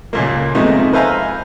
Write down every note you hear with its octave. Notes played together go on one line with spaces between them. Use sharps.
C#2 A#2 A#3
C3 F3 G#3 A3 B3 D#4
B4 C5 E5 F5 G#5 A#5